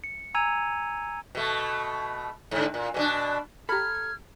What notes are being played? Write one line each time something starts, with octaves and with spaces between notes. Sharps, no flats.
C#7
G#5 A#5 E6 G#6 D#7 F7
B2 A3
G#2 D3
A#2
B2 A#3 D4
G4 A4 A#5 B5 F6 G#6